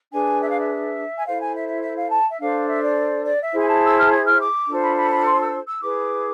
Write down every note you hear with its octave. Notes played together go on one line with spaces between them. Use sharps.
D4 G#4 B4 G#5
E5
F5
E5
G#5
E4 A4 C5 F5
G#5
E5
E5
E5
F5
A5
E5
D4 A4 C5 F5
E5
D5
D5
E5
E4 G#4 C5
G#5
A5
E6
F6
G#6
F6
D6
D4 F4 A4 C5
B5
B5
B5
C6
E6
E6
E4 G#4 B4 D6